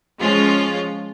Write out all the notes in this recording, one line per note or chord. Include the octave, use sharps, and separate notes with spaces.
F3 G#3 C#4 F4